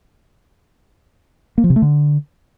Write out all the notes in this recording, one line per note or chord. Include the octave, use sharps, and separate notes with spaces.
A#3
F3
C3
A3
D3